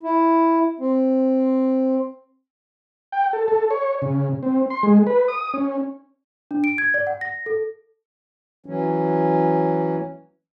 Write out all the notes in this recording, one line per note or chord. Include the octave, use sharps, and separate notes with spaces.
E4
C4
G5
A4
A4
C#5
C#3
C4
C6
G#3
B4
D#6
C#4
D4
D7
G#6
D5
F#5
A#6
A4
E3 F#3 C#4